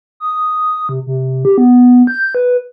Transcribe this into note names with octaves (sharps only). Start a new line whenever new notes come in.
D#6
C3
C3
G4
B3
G6
B4